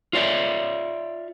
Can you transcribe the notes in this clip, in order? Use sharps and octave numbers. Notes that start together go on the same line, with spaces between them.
F4 C#5 D5 E5